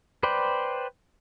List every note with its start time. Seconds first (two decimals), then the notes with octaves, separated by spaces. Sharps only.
0.23 B4 C5 D5 G5